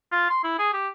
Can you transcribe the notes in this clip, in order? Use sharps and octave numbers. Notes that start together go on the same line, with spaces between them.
F4
C6
E4
G#4
G4